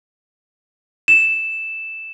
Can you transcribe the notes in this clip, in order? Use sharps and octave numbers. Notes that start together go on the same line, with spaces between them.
E7